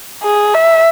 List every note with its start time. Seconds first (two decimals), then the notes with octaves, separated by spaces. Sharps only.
0.23 G#4
0.54 E5